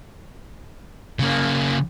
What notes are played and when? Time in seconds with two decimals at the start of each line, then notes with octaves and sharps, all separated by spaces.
1.19 C#3 A#3